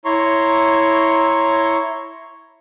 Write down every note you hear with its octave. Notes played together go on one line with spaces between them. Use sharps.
E4 C#5 A#5 C6 C#6